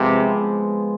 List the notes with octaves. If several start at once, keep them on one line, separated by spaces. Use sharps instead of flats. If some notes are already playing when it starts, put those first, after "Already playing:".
Already playing: C3 F3 G#3 B3